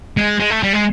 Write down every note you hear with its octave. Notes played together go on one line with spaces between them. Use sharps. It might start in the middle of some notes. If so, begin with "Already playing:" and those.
G#3
G#3
A3
G3
G#3